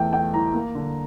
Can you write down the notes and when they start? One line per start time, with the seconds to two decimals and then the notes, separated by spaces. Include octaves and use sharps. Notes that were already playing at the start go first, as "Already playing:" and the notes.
Already playing: E2 A3 G5
0.13 A3 G5
0.34 E3 A#5
0.53 A#3
0.75 D3